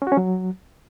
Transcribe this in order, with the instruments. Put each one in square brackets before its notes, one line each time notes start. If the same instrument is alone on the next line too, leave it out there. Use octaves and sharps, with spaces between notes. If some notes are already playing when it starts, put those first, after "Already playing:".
[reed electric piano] C#4
F#4
C#4
F#3